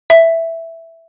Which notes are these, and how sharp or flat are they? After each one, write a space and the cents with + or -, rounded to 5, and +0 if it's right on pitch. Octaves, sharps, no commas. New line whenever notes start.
E5 +0